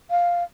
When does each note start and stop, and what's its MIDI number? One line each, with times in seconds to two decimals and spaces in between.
0.11 0.43 77